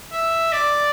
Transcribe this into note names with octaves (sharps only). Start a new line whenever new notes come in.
E5
D5